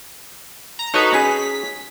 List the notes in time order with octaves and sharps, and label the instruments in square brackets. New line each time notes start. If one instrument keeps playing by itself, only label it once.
[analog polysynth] A#5
[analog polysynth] D#4 F#4 B4 [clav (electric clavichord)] A4 C#5 D#5
[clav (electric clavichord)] C#4 G#4 [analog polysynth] B6